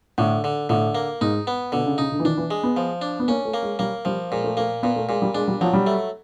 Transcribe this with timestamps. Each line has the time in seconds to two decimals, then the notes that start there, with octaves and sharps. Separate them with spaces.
0.18 A2 D3
0.44 D3
0.69 A2 D3
0.95 A#3
1.21 G#2 D#4
1.47 B3
1.72 B2 D3
1.86 C#3
1.98 C#3 D#4
2.12 D3
2.20 E3
2.25 D#3 D4
2.37 E3
2.51 G#3
2.63 B3
2.77 F3
3.02 D4
3.20 B3
3.28 A#3 C#4
3.45 A3
3.54 A#3
3.62 G#3
3.79 G3 A#3
4.05 F3 G3
4.31 A#2 G#3
4.44 A3
4.57 A3 A#3
4.83 A#2 B3
4.96 A3
5.09 A#2 G#3
5.22 G3
5.35 G#3 D4
5.48 G3
5.61 F3 F#3
5.73 G3
5.87 A3